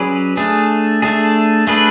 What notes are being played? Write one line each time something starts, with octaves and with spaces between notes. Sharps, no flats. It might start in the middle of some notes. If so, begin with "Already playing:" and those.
Already playing: F#3 C#4 G#4 B4 D5
A3 D4 G#4
A3 D4 G#4
A3 D4 G#4 B4